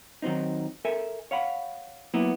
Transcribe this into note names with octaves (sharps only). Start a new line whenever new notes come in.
D#3 F#3 C4 D#4
A4 A#4 E5 G#5
C#5 F5 F#5 B5
F#3 A#3 B3 E4